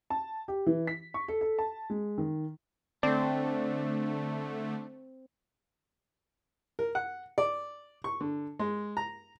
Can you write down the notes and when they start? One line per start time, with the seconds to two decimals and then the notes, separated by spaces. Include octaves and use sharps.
0.10 A5
0.48 G4
0.66 E3
0.87 B6
1.14 C#6
1.28 A4
1.41 A4
1.59 A5
1.90 G#3
2.18 D#3
3.03 D3 A3 C4 D4 D5
6.79 A#4
6.95 F#5
7.38 D5
8.04 C#6
8.21 D3
8.59 G#3
8.97 A#5